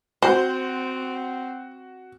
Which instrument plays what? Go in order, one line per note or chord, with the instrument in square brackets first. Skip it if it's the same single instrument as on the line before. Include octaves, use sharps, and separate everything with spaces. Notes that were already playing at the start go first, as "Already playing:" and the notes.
[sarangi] C4 [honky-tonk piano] F#4 [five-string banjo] C5